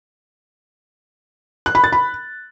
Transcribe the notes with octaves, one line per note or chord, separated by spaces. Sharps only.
F#6
B5
A6
B5